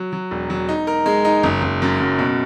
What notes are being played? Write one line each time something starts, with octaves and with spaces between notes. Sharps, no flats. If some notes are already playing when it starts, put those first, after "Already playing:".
Already playing: F#3
F#3
E1
F#3
D#4
A#4
G#3
D#4
F#1
F#1
F#2
F#2
B2